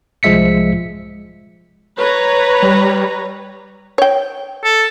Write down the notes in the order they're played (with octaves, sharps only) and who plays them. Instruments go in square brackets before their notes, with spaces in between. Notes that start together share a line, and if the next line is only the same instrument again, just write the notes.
[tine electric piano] C2 F3 G#3 E5 B6 C#7
[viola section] B4 C#5 A#5
[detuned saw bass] G3
[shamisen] C#5 G5
[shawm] A4